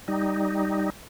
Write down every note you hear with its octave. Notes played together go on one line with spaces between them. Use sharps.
G3 D#4